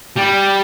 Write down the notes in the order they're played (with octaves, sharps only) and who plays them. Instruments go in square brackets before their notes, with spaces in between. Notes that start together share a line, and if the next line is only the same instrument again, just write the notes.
[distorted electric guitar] G3